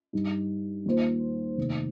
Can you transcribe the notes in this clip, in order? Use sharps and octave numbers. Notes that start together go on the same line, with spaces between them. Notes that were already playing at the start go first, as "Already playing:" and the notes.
G2 G3 D#4
D#2 D#3 A#3 F4 C5
F1 D#2 D#3